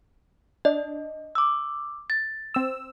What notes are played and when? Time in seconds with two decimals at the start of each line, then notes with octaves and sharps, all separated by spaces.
0.65 D4 D#5
1.35 D6 E6
2.10 A6
2.54 C4 E6